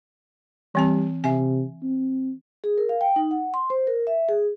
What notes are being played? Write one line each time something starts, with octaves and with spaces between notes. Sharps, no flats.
E3 G3 C4 A5
C3 E5 G#5
C4
G#4
A#4
F5
G5
D#4
F#5
C6
C5
A#4
E5
G#4